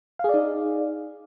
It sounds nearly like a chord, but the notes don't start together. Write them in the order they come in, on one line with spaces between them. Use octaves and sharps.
F5 G#4 D5 D#4